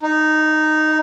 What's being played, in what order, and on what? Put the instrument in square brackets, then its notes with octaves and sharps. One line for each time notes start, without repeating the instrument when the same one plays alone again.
[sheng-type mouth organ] D#4